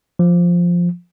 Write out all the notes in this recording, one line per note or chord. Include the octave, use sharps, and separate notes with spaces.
F3